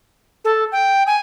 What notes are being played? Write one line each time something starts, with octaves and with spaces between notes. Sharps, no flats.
A4
G5
G#5